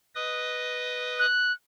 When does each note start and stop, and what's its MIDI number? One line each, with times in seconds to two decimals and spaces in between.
0.15 1.26 71
0.15 1.26 75
0.15 1.26 87
1.19 1.52 90